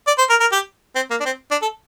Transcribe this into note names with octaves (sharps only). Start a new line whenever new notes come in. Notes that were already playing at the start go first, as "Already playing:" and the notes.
D5
C5
A#4
A#4
G4
C4
A#3
D4
C4
D4
A4